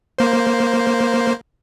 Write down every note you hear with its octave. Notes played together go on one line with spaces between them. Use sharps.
A#3 C5